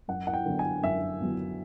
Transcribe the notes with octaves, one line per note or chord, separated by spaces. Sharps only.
F#2 F#5
F#5
G5
D3 F#3 B3
G#5
F#2 E5
D3 F#3 B3